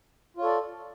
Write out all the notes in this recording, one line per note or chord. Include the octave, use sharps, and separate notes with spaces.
F4 A4 C#5 D5